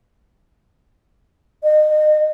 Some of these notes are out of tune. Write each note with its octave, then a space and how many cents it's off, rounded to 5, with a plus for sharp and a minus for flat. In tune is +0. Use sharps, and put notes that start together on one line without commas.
D#5 -30